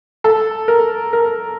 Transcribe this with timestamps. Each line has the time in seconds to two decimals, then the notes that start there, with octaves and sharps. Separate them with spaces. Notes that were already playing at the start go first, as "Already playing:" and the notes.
0.24 A4
0.68 A#4
1.13 A#4